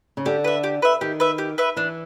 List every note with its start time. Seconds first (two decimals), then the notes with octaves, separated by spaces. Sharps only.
0.17 C#3
0.26 D3 G4
0.44 B4 E5
0.64 G4
0.82 B4 E5
1.01 D#3 G4
1.20 B4 E5
1.38 G4
1.58 B4 E5
1.76 E3 D4